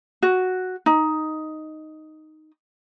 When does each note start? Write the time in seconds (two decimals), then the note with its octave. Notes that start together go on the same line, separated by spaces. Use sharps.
0.23 F#4
0.86 D#4